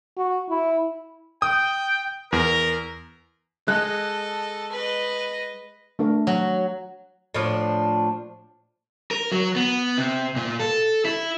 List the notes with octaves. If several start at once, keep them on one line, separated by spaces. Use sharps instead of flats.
F#4
E4
G5 D#6
E2 A#4
G#3 A4 D#5 F#6
B4 D#5
A3 D4 A#4
F#3
A2 F3 D4
A#4
F#3
B3
C3
A#2
A4
E4